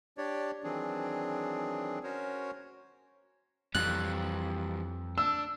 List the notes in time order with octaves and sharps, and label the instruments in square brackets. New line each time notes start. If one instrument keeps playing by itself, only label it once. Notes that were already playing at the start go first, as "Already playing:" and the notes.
[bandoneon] D4 G4 C#5 D5
D#3 E3 F#3 C4 D4 G#4
C#4 F#4 A#4 C5 C#5
[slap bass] F2 [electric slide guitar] E3 G3 [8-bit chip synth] F#6
[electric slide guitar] D4 [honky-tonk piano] E6